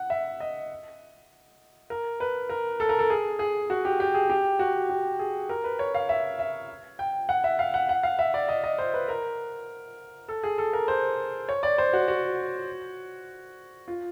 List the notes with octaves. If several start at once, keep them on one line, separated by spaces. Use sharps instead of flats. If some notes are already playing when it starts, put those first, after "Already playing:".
Already playing: F#5
E5
D#5
A#4
B4
A#4
A4
A#4
A4
G#4
G#4
F#4
G4
G4
G#4
G4
F#4
G4
G#4
A#4
B4
C#5
F5
E5
E5
G5
F#5
E5
F5
F#5
F#5
F5
E5
D5
D#5
D#5
C5
B4
A#4
A4
G#4
A4
A#4
C5
C#5
D5
C5
F#4
F#4
F4